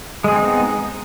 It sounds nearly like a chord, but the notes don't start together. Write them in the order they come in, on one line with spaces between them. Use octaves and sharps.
G#3 G#4 C4 D#4 B3